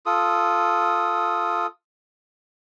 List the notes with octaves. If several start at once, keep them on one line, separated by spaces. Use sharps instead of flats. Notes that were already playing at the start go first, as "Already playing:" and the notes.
F4 A4 D#6